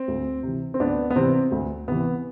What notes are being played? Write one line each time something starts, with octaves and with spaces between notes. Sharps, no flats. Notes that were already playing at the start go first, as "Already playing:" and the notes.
Already playing: C4
D2
C3 E3
C4
D2 B3 D4
B3
C3 E3 C4
D2
C3 E3 B3